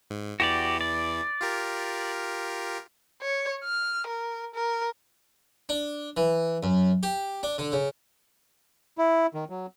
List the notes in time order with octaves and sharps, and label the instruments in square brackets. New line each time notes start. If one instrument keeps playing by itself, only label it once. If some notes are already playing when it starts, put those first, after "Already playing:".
[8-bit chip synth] G#2
[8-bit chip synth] E2 E3 [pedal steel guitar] F#4 G4 D5
[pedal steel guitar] D5
[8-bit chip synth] F4 G4 A#4
[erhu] C#5
F6
A#4
A#4
[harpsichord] D4
E3
F#2
G4
D4
D3
C#3
[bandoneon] E4
D#3
F#3